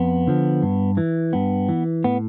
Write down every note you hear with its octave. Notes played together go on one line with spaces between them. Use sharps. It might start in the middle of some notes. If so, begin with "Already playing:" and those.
Already playing: F2 B3
D3 F3
G2
E3
G2 B3
E3
A2 B3